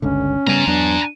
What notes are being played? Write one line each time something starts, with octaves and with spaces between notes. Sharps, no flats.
G1 C#2 D3 C#4
C#3 G3 B3 G#5 A#5
E2 F#3 B3 D4